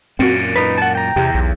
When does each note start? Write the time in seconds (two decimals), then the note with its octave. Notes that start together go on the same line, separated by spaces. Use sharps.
0.19 F#2 A#2 C4 F#4
0.56 D#4 B4
0.78 F#5 A5
0.95 G5 A#5
1.16 E2 C3 G4
1.35 B1